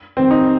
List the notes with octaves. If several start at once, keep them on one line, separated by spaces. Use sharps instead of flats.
F2 D#3 G3 C4
D#4